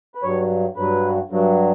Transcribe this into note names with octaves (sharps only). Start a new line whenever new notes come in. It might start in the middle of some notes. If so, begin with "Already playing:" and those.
B4
G2 F#3 C#5
G2 F#3 B4
G2 F#3